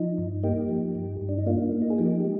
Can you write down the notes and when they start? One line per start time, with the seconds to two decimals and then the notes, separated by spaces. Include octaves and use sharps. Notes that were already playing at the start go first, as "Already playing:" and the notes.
Already playing: F3 D#4
0.18 G2
0.43 A#3 D#4 G4
0.69 F3
0.95 G2
1.21 G2
1.29 D4
1.38 D#4
1.46 A#3 D4 F4
1.73 A#3
1.82 D#4
1.90 G#4
1.98 F3 D#4 G4
2.24 G#3